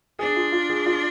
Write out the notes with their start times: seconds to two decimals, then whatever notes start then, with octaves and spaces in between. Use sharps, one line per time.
0.19 D4 G#4
0.36 F4
0.52 F4
0.70 G#4
0.86 F4